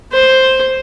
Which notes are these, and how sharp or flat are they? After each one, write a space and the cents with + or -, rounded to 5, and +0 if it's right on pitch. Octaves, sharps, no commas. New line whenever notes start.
C5 +5